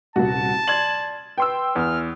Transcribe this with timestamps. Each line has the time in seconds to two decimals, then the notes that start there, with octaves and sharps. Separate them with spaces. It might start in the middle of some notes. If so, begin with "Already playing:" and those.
0.16 D#1 C2 F#4 A5
0.68 D5 C6 G#6 F#7
1.38 B4 G5 C6 E6
1.75 E2 F6